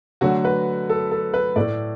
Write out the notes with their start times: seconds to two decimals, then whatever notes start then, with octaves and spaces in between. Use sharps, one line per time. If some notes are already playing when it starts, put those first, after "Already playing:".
0.21 D3 F#3 A3 F#4
0.45 B4
0.89 A4
1.11 A4
1.34 B4
1.56 A2 A3 D5